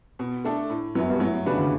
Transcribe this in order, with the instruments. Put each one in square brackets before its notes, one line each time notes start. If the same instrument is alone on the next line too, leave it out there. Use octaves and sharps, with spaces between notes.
[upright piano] B2
A3 D4 A4
A2
[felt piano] F#2 [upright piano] F#3 B3
[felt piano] G2
[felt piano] A2 [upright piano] F#3
[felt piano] C#3 [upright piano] B3 D4 F#4 B4
[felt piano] D3